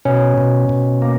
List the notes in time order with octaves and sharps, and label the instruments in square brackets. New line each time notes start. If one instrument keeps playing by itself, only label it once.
[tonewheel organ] B2 [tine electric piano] C#4
[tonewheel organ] B2
B2
A#3